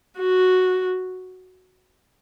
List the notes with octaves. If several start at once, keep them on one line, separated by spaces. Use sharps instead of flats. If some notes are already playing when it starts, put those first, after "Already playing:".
F#4